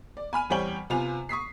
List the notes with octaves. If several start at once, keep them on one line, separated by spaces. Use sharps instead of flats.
D5
G#5 B5 F6 D#7
E2 G3 C4 C#5 G5 F#7
C3 B3 F4 C5 G#5 F7
C#6 D#6 B6 C7